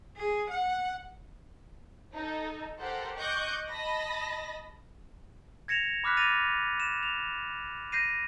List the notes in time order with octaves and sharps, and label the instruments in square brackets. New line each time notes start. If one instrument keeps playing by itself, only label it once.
[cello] G#4
F#5
[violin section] D#4 A4
G4 A4 A#4 C5 F#5
D#5 C#6 D6 F#6 G6
D#5 A5 B5 A#6
[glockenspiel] G#6 A#6 C#7 E7 F7
B5 D6 F6 F#6 B6
A6 A#6 D#7 F7
E7
F7
G6 A#6 C7 D#7